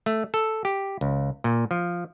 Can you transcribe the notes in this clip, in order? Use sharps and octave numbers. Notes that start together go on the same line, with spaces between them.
A3
A4
G4
C#2
A#2
F3